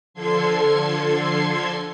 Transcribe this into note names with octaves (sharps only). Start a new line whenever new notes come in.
D3 F3 A4 C6 G#6 C7